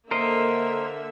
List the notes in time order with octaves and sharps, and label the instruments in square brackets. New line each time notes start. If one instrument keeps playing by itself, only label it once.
[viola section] D3 A#3 E5 [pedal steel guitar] A#4 C5 D#5